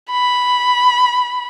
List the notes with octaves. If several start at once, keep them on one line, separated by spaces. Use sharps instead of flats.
B5